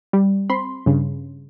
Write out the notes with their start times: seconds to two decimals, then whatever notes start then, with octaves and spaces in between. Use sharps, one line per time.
0.13 G3
0.49 C4 B5 C6
0.86 G2 C#3